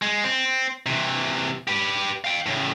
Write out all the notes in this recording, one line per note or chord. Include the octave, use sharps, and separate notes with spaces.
G#3
C4
C3 E3
G4 B4
F5 G5
A2 C#3